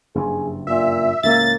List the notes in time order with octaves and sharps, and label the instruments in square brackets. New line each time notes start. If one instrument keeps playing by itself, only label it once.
[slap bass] F#1 G2 [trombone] G#4
[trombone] A#2 [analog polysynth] E5
[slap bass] C#2 A2 [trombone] A#3 [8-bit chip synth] A6